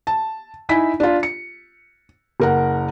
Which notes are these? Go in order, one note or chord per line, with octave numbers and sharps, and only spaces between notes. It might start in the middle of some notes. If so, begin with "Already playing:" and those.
A5
D#4 E4 G#5 B6
D4 F4
C#7
F#1 A#4 F#5